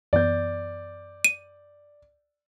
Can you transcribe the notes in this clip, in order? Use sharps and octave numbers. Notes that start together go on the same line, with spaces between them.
F#2 E3 B3 D5 G6
D#7